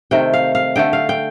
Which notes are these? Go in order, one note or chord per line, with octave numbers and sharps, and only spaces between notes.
C3 D#3 A3 G5
F5
F5
D3 A3 G5
F5
G5